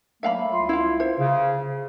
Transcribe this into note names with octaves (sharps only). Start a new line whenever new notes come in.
F#3 A3 A#3 E5 F5 B5
C2 F4 C6
E4 F5
C5
C#3